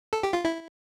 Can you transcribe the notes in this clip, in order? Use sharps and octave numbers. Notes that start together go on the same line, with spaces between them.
A4
G4
F4
E4